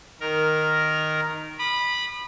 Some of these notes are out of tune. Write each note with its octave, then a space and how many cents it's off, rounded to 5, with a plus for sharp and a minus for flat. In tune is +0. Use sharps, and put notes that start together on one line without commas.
D#3 -5 A#4 +0
B5 -10 D#6 -45